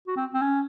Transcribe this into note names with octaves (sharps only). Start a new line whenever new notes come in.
F#4
C4
C4
C#4